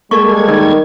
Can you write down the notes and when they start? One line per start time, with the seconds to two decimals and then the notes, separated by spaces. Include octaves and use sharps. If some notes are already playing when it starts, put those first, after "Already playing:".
0.11 G3 G#3 A#3 A4 C#6 G#6
0.49 D#3 A#4